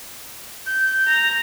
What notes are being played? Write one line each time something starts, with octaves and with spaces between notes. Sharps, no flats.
G6
A#5